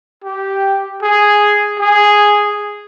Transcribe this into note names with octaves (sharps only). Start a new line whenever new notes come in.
G4
G#4
G#4